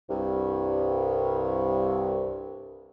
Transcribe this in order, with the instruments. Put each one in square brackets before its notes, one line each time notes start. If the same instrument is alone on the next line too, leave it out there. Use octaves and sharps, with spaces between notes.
[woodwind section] C2 G2